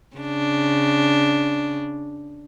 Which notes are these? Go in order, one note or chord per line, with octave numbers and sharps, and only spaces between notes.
C#3 D4